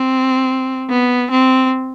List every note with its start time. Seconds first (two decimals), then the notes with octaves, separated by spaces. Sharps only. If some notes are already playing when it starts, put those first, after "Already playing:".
Already playing: C4
0.90 B3
1.31 C4